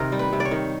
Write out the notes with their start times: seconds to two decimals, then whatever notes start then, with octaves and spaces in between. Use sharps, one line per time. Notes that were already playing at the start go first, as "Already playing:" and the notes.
Already playing: C3 D#3 G4 A#4
0.12 G3
0.19 B4
0.33 C3
0.40 D5
0.45 C#5
0.51 D#3